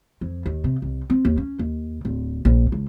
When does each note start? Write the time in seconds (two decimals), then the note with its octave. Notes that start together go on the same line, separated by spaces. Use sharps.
0.21 F2
0.46 D#2
0.64 C3
0.82 C2
1.10 C4
1.25 D#2
1.37 C#4
1.59 D#2
2.05 D1
2.45 A#1
2.72 C#2